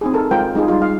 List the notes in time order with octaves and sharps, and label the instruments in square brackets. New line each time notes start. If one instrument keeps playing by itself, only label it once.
[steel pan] C4 D#4 G#4
A4 A#4
G#3 F4 A#4 C5 G5
G#3 D#4 F4 G#4
G3 D#4 F4
F5